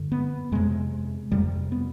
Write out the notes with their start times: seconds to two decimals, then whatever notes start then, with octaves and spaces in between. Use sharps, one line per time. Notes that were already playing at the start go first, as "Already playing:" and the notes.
Already playing: G2 D3
0.12 B3
0.52 F2 C3 G#3
1.31 F2 C3 G3
1.72 B3